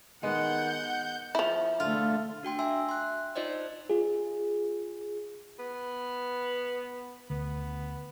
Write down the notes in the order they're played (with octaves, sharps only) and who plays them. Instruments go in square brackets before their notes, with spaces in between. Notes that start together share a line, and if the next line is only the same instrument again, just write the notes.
[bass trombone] D#3 [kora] G#3 B3 [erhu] F#5 [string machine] G6
[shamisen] F3 E4
[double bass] D3 A3 [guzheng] F4
[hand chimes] D4 F#4 G5 C6
E5 G5 G#5 C6 E6
C6 F#6
D#4 F4 C5 D5 D#5
[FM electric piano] F4 G#4
[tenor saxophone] B3
[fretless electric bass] D2 [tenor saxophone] B3